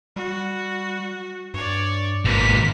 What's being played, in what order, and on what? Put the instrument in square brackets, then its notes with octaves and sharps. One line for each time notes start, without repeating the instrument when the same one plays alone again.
[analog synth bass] G3 [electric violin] F#4
[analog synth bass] G2 [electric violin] C#5 D5
[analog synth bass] G#1 [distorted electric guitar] G#2 B2 [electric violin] A#3 B6